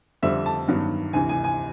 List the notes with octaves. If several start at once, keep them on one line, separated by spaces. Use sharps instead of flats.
F2 D3 G3 C4 E5
A5
G2 D#3 F#3 B3
D2 C3 E3 G#5
G#5
G#5